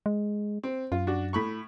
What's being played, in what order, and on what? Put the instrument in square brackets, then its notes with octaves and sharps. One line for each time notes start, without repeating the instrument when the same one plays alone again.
[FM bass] G#3
[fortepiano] C4
[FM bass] F#2 [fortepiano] F4
[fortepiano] D4 F#4
A2 B5 C#6